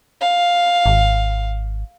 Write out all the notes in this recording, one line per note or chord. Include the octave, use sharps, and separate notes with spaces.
F5
G#1